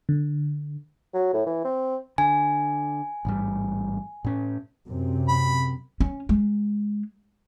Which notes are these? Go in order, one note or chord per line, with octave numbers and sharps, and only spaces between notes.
D3
F#3
A2
E3
C4
D3 G#5
A1 G#2 G3
A2 C#4
F#2 C3
B5
C#4
G#3